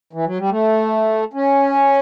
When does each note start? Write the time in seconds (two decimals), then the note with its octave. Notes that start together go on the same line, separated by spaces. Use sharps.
0.13 E3
0.26 F#3
0.38 G3
0.49 A3
1.33 C#4